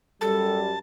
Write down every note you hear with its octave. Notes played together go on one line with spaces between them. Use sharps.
F#2 G3 A4 A5